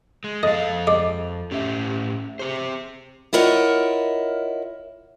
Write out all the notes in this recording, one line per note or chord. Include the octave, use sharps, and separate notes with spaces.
G#3
F2 A4 D#5 F5 A6
G#3 D5
A2 C#4 G4 E5
C4 G4 G#4 C5
E4 F4 A#4 C#5 D#5 F#5